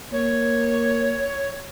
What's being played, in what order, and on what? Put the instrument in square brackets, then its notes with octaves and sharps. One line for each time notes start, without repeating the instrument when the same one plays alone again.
[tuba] A#3 [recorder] C#5